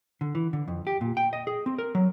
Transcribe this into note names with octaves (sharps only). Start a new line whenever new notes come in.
D3
E3
D3
F2
G4
A#2
G5
D#5
G#4
C4
A#4
F#3